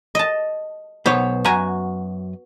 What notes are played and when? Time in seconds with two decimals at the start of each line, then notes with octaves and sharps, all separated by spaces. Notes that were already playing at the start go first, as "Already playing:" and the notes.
0.15 D#5 A5
1.06 B1 B3 C5 C#5
1.45 F#2 F#4 G#5 A#5